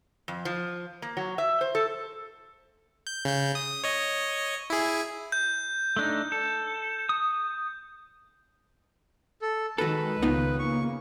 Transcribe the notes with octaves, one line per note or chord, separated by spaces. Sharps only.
F2
F3
A#3
F#3
E5
C5
A4
G6
C#3 G6
D#6
C#5 D#5
E4 G#4
G6
A3 D4 D#4
A4
D#6
A4
D#3 G#3 F#4 A4 B4
C#2 D#3 B3 D#4 F4
C#3 A#3 C#6